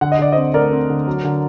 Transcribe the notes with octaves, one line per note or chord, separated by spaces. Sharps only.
D3 F#5
D#5
D3 D5
C4 C5 D#5
A3 A#4 D5
C4
D3
F#3
D3